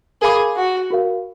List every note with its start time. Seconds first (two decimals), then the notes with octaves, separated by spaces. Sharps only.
0.22 G#4 A#4 F5 B5 D6
0.56 F#4
0.90 F#4 A#4 F5